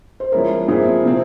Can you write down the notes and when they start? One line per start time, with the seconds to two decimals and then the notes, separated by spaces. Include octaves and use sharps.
0.20 C5
0.32 F3 G#3 C#4 E4 A#4
0.68 A#2 F3 C4 E4 G#4
1.04 C3 F3 C4 E4